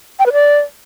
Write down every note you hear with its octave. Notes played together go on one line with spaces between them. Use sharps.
G5
B4
D5